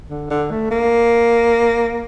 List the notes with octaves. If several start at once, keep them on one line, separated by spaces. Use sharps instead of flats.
D3
D3
A3
A#3